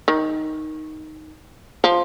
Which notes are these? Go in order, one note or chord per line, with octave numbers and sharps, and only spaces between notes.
D#3
F3